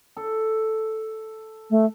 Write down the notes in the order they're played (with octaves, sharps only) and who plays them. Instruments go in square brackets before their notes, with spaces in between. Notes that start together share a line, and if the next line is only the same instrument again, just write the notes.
[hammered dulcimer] A4
[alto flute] A3